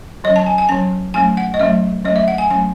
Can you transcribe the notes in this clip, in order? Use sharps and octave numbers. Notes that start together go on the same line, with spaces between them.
F#3 C#4 D#5
A5
G#5
G#5
F#3 C#4 A5
F#3 A3 C#4 G#5
F#5
D#5
F#3 A3 C#4 E5
F#3 A3 C#4 D#5
E5
F#5
G#5
F#3 A3 C#4 G#5